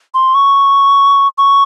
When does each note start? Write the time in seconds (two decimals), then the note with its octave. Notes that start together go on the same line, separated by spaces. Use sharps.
0.14 C6
0.35 C#6
1.38 C#6